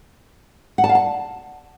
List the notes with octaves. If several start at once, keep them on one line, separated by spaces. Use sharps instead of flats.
F#5
A5
F5
A5